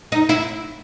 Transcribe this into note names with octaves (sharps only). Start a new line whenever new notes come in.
D#4
E4